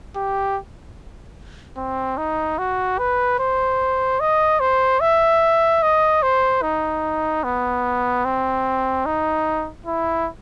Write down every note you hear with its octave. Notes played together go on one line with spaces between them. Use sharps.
G4
C4
D#4
F#4
B4
C5
D#5
C5
E5
D#5
C5
D#4
B3
C4
D#4
E4